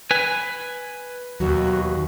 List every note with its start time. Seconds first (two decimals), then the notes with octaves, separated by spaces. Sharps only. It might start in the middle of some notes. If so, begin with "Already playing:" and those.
0.11 B4 G#5
1.40 D#2 B2 F#3 F#4